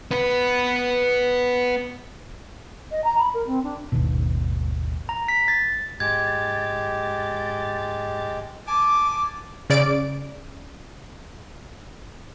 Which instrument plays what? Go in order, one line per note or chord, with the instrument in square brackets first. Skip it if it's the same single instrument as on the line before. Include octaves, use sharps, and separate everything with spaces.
[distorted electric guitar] B3 B4
[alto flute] D#5
A#5
B5
A#4
C4
D4
[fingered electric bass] G#1 D#2 B2
[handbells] A#5
B6
A6
[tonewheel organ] G#2 A6 [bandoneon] G#3 [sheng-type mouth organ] G4 [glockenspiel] G#6
[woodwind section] G#5 A5 D6
[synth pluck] C#3 D5 D7